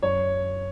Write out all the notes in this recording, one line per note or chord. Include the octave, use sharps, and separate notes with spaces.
F#2 C#5